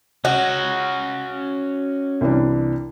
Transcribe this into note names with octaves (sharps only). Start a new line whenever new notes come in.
C#4 F#4 D#5
C2 E3 D4